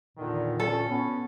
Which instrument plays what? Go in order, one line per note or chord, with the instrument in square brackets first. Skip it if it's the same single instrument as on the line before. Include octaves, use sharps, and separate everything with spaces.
[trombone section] E2 D3 D#3 [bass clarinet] A#2
[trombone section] A1 D2 C#4 [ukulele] A4
[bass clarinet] B3 [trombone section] C#4